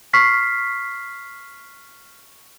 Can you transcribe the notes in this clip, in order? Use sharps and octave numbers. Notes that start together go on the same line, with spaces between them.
C#6 F6 B6 C7